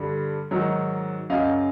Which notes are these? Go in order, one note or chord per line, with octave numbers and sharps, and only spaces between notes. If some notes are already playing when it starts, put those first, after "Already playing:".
Already playing: G2 D3 G3
G#2 D#3 F#3
F#2 C#3 F#3 D#5 F5